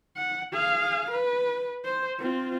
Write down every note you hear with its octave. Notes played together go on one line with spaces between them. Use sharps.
F#5
G#4 F5
B4
C5
C4 F4